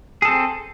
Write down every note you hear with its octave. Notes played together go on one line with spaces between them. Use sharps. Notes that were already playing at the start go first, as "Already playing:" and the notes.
C4 G#4 A4